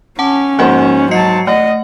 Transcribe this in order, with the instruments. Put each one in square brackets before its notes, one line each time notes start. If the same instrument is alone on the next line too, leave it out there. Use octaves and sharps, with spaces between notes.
[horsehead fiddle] C#4 [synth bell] F#5 A5 D6
[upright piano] G#2 C5 F#5 [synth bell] F3 A#3 F#4
[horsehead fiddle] F#3 A5 [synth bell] D#5 C7 C#7
[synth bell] A3 [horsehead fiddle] D#5 [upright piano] F#5